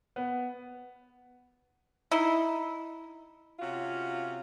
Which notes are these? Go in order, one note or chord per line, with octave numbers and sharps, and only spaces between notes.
B3
D#4 E4
C3 C#4 F4 F#4